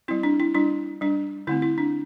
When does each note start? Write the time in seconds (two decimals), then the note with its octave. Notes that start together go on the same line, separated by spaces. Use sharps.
0.08 G3 C4 E4
0.23 D4
0.40 E4
0.55 G3 D4 E4
1.01 G3 D4
1.47 D3 A3 C4 E4
1.62 E4
1.78 D4